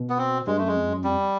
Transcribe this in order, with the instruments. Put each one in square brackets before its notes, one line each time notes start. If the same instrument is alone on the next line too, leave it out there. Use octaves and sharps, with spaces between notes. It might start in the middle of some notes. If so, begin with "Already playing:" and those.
Already playing: [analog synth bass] B2
[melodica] B3
C4
[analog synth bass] G2 [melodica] G#3
[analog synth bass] F#2 [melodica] A3
[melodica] G#3
[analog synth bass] F2
F#2
[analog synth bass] F2 [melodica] G3